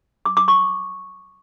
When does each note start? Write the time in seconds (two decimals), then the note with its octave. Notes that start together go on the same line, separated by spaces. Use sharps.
0.25 D6
0.37 D6
0.48 C#6